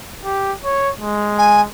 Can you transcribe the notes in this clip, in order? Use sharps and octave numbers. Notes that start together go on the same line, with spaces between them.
G4
C#5
G#3
G#5